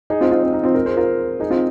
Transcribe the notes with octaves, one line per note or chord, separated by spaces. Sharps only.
D#4 G#4
C4 F4
C4 F4
C4
D#4
C4 F4
F4 A#4
G#4 C5
F4 A#4
D#4 G#4
C4 F4